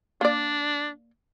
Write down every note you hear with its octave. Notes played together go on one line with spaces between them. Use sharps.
A#3 D4 D5